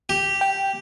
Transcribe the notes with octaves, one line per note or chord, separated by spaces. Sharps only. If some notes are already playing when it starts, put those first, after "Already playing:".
G4
G5